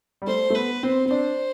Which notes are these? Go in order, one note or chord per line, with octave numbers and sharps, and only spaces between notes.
G3
A3 C5
A3
B3 B4
C4 C5
C4
D4 C5